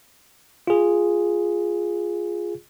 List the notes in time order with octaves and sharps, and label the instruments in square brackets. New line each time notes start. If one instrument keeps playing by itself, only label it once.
[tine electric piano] F4 G#4